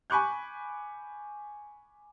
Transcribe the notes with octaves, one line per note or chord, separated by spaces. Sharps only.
G#5 B5 C#6 D6 F#6 G6